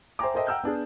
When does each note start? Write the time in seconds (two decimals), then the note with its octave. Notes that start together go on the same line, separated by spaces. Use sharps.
0.19 C5 E5 G5 G#5 A#5 D6
0.34 A4 A#4 C5 D#5 E5 G5
0.47 F#5 G5 A#5 E6 F6 G6
0.64 B3 D4 G#4